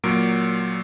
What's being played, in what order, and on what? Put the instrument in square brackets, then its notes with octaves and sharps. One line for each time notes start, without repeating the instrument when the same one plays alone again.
[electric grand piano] A#2 F#3 A#4 D7